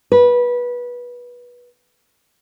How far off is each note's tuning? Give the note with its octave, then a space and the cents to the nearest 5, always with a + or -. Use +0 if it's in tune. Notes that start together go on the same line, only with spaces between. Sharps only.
B4 -20